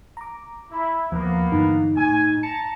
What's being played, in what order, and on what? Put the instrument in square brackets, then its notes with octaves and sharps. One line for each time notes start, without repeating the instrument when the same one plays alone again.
[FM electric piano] A#5 D6
[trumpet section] E4
[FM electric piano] D#2 [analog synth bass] F3 [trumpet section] A#3 B3
[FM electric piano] G2 D3 E3 [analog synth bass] D#4
[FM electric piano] A2 [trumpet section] G#5
[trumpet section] A5 A#5 [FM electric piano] C#7